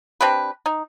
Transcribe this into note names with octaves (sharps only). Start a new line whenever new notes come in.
C4 D4 G4 B4
D#4